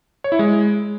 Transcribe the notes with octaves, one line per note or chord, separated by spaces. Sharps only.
C#5
E4
G#3